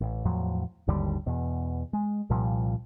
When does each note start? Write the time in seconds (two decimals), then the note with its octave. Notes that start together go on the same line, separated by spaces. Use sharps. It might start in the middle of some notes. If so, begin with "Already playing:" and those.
0.01 A1
0.25 E2 A2 F3 F#3
0.87 G#1 D#2 D3 G3
1.26 E2 B2
1.93 G#3
2.30 C2 A#2 F3 G3